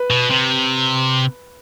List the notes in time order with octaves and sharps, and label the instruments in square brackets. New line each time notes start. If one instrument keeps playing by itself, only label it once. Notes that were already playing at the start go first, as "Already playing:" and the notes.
Already playing: [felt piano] B4
[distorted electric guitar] B2
C3